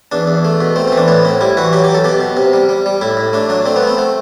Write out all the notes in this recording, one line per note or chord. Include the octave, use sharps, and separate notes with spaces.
E2 D4
E2
A3
B2
A3 C4
E3 C4
D4
A2 B3
A2 C4
G3 E4
E3 F#4
F#3 G4
G4
F#3
A4
B2 G4
B2
C3
G3
G3
G3
A2 E4
A2
A3 D4
F#3 D4
A3 C4
B3
A3 C4
A3